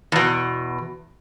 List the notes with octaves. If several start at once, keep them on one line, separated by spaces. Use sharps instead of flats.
E2 B2